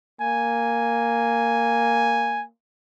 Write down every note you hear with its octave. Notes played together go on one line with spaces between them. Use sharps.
A#3 G#5